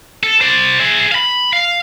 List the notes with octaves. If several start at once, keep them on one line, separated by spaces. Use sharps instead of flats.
A4
C5 D5
G#4 E5
F5 B5
F5